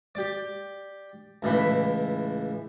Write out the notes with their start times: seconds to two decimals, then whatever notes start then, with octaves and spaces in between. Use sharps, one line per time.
0.15 G4 D5
1.42 C#2 A2 E3 B5